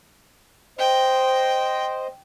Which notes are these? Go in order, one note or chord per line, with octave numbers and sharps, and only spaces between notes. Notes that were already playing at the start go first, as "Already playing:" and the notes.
C5 D#5 G5